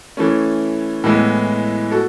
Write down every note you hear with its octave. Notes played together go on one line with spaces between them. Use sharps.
E3 A3 C#4
A2 E3 G#3 B3
F#4 A4